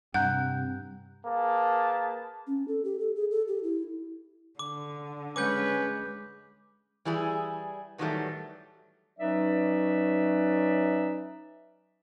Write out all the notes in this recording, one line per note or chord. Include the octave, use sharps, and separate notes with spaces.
G2 C3 C4 F#5 A#5 F#6 G6
A#3 G#4 B4 A5
C#4
A4
G4
A4
G#4
A4
G4
E4
D3 D6
G#3 C#4 B4 D6 G6
E3 G3 E4 G#4
A2 D#3 E3 F#3 G3 A3
F#3 C#4 D#4 B4 D5 E5